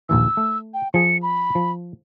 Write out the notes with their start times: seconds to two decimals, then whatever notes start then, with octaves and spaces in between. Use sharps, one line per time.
0.09 A#1 D#2 E3 E6
0.37 A3
0.74 G5
0.94 F3 G#4 C#7
1.23 B5
1.55 F3